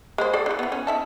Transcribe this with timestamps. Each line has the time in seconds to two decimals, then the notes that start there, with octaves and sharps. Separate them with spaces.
0.18 G#3 A#3 C5
0.33 G#4 A4 D5
0.46 D3 E3
0.59 E3 B3
0.72 C#4
0.87 D#4 E5 A5